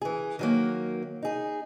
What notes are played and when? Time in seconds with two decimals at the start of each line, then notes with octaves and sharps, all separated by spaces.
0.02 E3 G#4
0.39 D#3 F#3 A#3
1.22 D#4 G#4